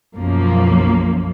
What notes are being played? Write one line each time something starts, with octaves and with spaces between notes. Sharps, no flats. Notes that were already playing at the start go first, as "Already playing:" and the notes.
B1 F#2 F3 A#3